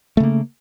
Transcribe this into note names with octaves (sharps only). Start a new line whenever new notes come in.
C#3 A3 A#3